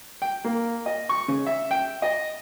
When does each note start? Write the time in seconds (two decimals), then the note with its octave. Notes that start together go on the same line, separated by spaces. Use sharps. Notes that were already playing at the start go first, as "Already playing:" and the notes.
0.22 G5
0.44 A#3
0.86 D#5
1.09 C#6
1.28 C#3
1.46 E5
1.71 G5
2.02 D#5